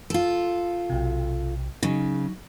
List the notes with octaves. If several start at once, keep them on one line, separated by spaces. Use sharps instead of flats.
F4 A4
B1 C3
C#3 F#3 D#4